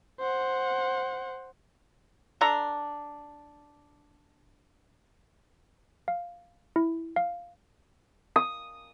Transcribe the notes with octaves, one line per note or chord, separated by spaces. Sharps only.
C5 F#5
D4 A4 A#5
F5
E4
F5
D#6